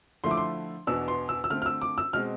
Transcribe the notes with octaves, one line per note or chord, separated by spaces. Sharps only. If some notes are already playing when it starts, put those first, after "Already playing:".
D3 F3 A3 E4 C6
D6
C6
E2 B2 B3 D4 E6
C6
E6
E6
D3 A3 C4 F6
F6
E6
D6
E6
B2 G#3 C4 F6